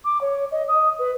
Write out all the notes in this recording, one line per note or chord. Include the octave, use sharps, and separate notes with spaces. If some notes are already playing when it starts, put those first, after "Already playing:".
D6
C#5
D#5
D#6
B4